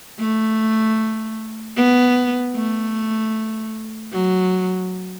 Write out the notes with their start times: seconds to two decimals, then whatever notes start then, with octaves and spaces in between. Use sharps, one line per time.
0.19 A3
1.76 B3
2.56 A3
4.12 F#3